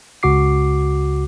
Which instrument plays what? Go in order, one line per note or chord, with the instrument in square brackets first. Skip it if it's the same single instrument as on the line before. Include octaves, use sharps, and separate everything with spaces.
[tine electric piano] C#2 C#3 F#4 D6 C7